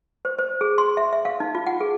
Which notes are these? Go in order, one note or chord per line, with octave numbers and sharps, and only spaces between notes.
C5
C5
G#4
C6
E5
E5
F5
D#4
F4
F#5
G#4